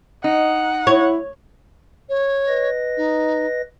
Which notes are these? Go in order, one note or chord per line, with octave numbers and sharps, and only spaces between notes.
D#4 F#5
E4 C#5
C#5
B4 D#5 A#6
D#4